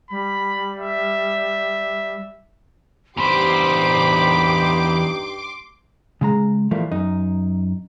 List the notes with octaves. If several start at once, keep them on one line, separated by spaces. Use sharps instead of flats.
G3 B5
E5
E2 G2 D#4 G4 C5 B5 C6 D6
C#3 G#3 A#5
E3 F3 G3 A3 A#3
F#2 D#4